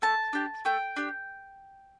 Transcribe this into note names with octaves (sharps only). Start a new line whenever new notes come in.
A3 A5
D4 G4
A3 G5
D4 G4